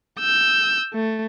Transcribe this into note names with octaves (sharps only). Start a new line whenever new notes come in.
E6 G6
A3